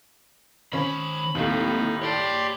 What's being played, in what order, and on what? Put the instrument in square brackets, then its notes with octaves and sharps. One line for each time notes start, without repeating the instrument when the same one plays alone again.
[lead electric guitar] D#3 C5 [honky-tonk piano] C#4 [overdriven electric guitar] B5
[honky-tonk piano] D#2 A2 [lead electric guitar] A#3 C4 [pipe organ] D#4
[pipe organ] G4 D5 C6 [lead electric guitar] C#5 A5